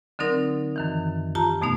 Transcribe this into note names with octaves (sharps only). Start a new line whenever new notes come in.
D3 F#3 C4 D#4 A#4
F#2 D#3 E3
F4 G4 A5 A#5
F2 B2 A3 B3 D#4